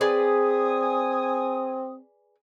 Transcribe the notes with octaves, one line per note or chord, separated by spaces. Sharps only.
C4 G#4 B4 D5 G#5 D#6